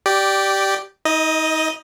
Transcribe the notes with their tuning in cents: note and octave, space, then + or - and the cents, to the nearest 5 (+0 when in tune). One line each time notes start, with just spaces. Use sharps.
G4 -10 D5 +5
D#4 +35 D#5 +0